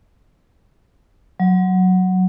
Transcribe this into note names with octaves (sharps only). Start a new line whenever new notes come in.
F#3